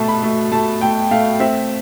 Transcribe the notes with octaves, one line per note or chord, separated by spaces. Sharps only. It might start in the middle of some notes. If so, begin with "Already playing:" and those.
Already playing: B2 A3 A5
B5
A3
A3 A5
A3 G5
A3 F5
C4 E5